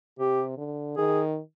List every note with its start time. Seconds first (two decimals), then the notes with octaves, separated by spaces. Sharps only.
0.18 C3 G4
0.57 D3
0.97 D#3 G#4